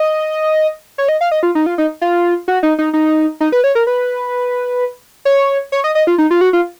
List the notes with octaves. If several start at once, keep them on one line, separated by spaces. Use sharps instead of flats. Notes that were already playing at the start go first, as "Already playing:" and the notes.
Already playing: D#5
C#5
D#5
F5
D#5
F4
D#4
F4
D#4
F4
F#4
D#4
D#4
D#4
D#4
B4
C#5
A#4
B4
C#5
C#5
D#5
D#5
F4
D#4
F4
F#4
F4